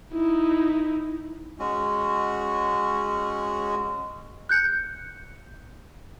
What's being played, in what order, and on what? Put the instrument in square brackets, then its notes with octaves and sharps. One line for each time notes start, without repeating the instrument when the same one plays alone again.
[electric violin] D#4 E4
[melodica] G#3 C#4 F#4
[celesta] F#6 G6 C#7